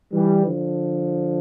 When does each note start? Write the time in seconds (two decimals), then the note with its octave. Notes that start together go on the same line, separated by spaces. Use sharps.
0.12 E3 G3
0.45 D3 F3